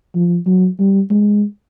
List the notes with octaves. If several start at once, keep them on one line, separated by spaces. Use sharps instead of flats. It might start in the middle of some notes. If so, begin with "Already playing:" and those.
F3
F#3
G3
G#3